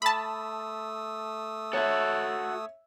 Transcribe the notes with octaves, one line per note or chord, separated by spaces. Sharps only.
A3 A5 B5 D#6 E6
F#4 A4 C#5 E5